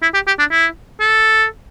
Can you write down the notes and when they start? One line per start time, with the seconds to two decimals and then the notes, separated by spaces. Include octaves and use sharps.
0.02 E4
0.14 G4
0.27 G4
0.39 D4
0.51 E4
1.00 A4